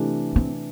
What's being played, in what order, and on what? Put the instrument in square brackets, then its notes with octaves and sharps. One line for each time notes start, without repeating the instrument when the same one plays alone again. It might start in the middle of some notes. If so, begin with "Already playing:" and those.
Already playing: [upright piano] C3 E3 A3 D4
[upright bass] C4